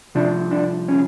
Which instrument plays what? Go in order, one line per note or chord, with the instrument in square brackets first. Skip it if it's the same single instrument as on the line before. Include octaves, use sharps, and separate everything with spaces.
[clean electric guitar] C2 C3 F3 D4
D4
C#4